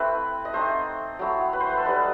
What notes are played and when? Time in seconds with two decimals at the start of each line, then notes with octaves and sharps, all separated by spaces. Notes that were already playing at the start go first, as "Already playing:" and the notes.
Already playing: A3 C4 E4 B4
0.45 D#5
0.54 A3 C4 D#4 C5
1.19 F#3 A3 E4
1.53 B4
1.60 C5
1.70 B4
1.77 A4
1.85 G3 D#4 B4